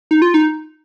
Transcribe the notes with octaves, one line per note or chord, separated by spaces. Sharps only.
D#4
F4
D#4